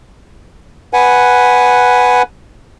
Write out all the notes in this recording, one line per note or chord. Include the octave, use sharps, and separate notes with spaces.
B4 F#5 G#5